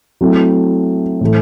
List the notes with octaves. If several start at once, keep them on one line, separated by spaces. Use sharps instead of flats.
F#3 A3 C4 E4
A2 E3 A3